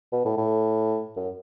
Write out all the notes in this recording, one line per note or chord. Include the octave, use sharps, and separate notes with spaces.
B2
A2
A2
F#2